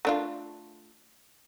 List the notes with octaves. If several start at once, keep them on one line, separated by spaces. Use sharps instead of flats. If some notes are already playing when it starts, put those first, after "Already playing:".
A3 D4 F4